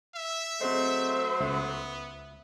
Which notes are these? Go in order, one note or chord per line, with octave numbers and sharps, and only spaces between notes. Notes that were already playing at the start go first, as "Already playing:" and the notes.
E5
F#3 A3 C4 G#4 C5 D#5
C#2 B3 E5